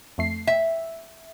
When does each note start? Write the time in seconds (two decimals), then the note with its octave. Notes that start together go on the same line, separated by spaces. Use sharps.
0.18 F2 A3 C7
0.47 E5